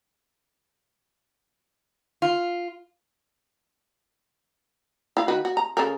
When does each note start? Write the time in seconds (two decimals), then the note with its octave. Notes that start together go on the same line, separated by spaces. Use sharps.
2.22 F4
5.17 E4 F5
5.28 D#3 F#4 B4
5.45 F#4
5.57 A#5
5.77 C#3 A4 A#4